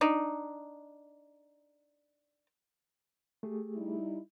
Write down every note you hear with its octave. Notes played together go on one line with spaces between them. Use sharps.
D4 D#4
A3 G4 G#4
G3 D#4 E4